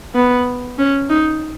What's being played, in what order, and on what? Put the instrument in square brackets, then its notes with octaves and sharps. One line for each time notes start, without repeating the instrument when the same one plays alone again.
[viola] B3
C#4
D#4